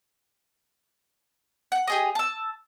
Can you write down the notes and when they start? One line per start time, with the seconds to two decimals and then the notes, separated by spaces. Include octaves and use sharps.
1.72 F#5
1.87 G4 G#4 D#5
2.15 A5 E6